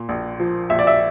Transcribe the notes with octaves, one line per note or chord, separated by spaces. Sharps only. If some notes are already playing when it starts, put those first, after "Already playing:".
Already playing: A#2
A#1
F3
A#1 E5
D5
E5